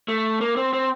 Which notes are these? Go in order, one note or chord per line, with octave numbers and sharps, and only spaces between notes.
A3
A#3
C4
C4